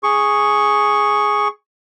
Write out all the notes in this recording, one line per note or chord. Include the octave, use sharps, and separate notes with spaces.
G#4 C#6